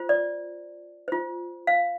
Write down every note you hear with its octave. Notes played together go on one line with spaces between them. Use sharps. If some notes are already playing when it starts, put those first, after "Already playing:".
Already playing: F4 C5
D5
F4 C5
F5